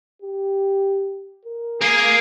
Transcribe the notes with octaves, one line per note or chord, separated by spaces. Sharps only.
G4
A#4
A#3 G#4